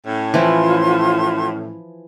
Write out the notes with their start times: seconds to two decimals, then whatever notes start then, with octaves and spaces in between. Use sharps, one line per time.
0.06 A2 C#4
0.34 E3 F3 E4 F4 C6